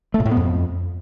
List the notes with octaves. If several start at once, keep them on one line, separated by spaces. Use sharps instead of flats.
A3
A#2
A2
B3
F2